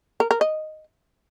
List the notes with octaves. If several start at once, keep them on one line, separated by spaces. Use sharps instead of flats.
A#4
A#4
D#5